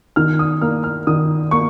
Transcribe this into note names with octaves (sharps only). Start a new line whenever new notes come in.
D#3 F6
D#6
A#3 F6
F6
D#3 D#6
A#3 C#6